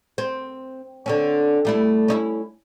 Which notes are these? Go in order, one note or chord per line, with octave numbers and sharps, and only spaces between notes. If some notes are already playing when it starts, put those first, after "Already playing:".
C4
D3 C4 C#4
G3 A3 E4
C#4 D#4 E4